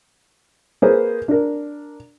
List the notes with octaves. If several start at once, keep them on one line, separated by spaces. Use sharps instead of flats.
A#3 G#4 B4 C5
D4 A#4